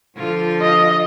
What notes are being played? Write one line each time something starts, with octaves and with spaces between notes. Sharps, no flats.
D3 F3 F4
D#5